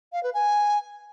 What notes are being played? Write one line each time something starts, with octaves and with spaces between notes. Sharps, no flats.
F5
B4
G#5